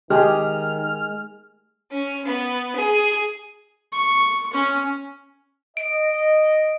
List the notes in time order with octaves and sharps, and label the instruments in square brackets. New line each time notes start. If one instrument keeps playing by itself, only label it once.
[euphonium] D#3 [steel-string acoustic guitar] G#3 [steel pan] G4 G#4 [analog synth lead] F6
[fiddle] C#4
B3
G#4
[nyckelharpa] C#6
C#4
[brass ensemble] D#5 [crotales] D7